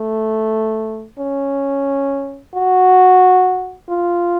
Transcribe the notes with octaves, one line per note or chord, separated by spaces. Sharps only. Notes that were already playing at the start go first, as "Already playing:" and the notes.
Already playing: A3
C#4
F#4
F4